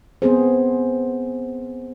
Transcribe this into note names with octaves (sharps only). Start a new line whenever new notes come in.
B3 C4 G#4 C5